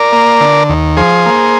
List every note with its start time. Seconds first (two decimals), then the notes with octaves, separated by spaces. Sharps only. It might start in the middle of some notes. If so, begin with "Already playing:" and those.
Already playing: A#4 D5
0.12 A#3
0.41 D3
0.69 D#2
0.97 F3 G#4 C5
1.26 A#3